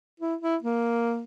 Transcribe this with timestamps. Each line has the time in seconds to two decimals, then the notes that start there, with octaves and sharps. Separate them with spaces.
0.20 E4
0.41 E4
0.63 A#3